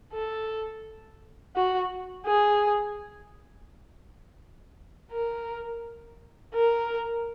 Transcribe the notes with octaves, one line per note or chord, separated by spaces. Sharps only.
A4
F#4
G#4
A#4
A#4